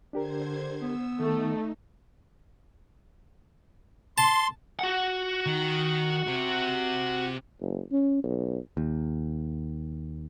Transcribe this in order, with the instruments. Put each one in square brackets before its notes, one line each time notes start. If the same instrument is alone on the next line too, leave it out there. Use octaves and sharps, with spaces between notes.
[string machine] D3 C5 G#6 [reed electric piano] D4 G4 A#4
[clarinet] B3 [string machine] E6
[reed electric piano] D#3 [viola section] A3 [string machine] D#4
[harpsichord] A5 [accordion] C6
[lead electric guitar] F#4 F#5
[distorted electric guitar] D#3
C3
[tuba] F#1
C#4
B1
[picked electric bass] D#2